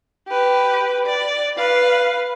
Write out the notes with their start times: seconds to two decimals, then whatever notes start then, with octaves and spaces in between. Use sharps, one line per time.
0.28 G4 B4
1.06 D5
1.58 B4 F5